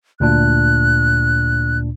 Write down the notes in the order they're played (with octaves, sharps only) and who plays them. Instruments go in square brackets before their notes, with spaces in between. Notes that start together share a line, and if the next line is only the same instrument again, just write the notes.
[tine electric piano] D2 A#2 D4 [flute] F#6